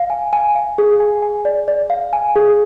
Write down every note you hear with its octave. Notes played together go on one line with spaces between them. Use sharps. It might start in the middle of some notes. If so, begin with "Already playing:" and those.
Already playing: F5
G#5
G#5
F5
G#4
G#5
G#5
D5
D5
F5
G#5
G#4